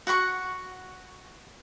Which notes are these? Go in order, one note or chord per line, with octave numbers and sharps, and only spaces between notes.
F#4 F#5 B5 C#6